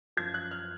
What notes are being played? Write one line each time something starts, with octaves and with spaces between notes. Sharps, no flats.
F#2 F3 G#6
F#6
F6